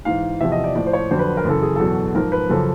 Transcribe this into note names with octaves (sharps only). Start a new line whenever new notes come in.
G#2 E3 F5
E2 C3 F3 E5
D#5
D5
A2 F3 D5
C5
C#5
F2 D3 F#3 C5
B4
A#4
F#2 C#3 E3 A4
G#4
E2 B2 F#3 A4
G#2 F3 A#4
B4
F#2 C#3 F3 A4